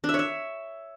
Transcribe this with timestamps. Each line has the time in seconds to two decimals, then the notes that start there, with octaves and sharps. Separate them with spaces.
0.04 D4
0.09 E5
0.14 C#5
0.19 E5